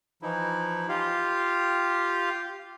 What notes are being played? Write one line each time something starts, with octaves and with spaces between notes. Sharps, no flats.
E3 F3 D#4 E4
F4 G4 F5